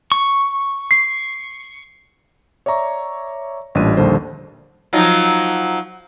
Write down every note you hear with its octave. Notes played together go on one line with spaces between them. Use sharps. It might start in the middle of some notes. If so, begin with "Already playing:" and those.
C#6
C7
C#5 D5 E5 A#5 C#6
A1 A#2 G3 D4 F#6 D#7
A#1 D#2 D3 G3 C5
F3 F#3 D#4